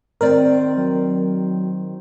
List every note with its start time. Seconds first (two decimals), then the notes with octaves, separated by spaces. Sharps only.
0.21 D#3 C4 A#4 D5
0.77 F#3